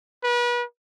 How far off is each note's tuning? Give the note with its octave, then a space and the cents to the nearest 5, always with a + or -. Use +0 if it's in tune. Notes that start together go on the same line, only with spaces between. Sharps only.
B4 -35